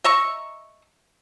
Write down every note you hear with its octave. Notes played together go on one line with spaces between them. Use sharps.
D#5 E5 A#5 C#6